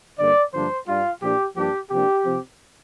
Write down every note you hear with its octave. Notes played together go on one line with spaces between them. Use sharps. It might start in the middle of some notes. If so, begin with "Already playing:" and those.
G2 D3 A#3 D5
G2 D3 F3 A#3 D4 C5
G2 G3 D4 F4
A#2 F3 D4 G4
G2 F3 A#3 D4 G4
C3 F3 A#3 D4 G4
C3 F3 C4